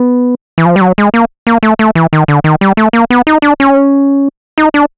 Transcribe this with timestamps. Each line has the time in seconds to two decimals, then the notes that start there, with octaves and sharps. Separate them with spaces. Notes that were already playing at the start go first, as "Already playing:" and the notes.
Already playing: B3
0.58 E3
0.65 F3
0.76 G3
0.81 F#3
0.98 G#3
1.14 A#3
1.47 A#3
1.63 A3
1.79 A3
1.95 E3
2.13 D#3
2.28 D3
2.44 D#3
2.61 G3
2.77 A3
2.93 A#3
3.10 B3
3.27 D#4
3.42 D4
3.60 C#4
4.58 D#4
4.74 D4